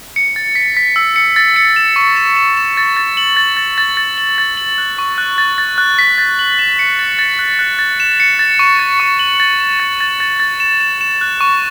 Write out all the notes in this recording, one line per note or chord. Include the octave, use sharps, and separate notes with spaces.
C#7
A6
B6
B6
E6
C#7
A6
C#7
E7
C#6
E7
E7
E7
A6
A6
F#7
A6
A6
A6
A6
F#7
A6
F#7
F#6
C#6
F#6
A6
A6
F#6
B6
A6
F#7
E7
C#7
A6
A6
F#6
F#6
A6
E7
C#7
A6
C#6
A6
C#6
F#7
A6
E7
A6
A6
A6
A6
E7
E7
E7
F#6
C#6